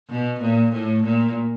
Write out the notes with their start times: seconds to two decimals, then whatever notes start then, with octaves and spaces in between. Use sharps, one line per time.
0.09 B2
0.41 A#2
0.72 A2
1.03 A#2